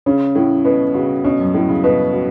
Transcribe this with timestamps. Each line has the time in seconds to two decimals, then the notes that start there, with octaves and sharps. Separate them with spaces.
0.06 C#3 C#4
0.35 A2 A3
0.65 B2 B4
0.94 C#3 F#4
1.24 B2 C#4
1.40 F#2
1.54 A2 A3
1.69 C#3
1.84 B2 B4
2.13 F#4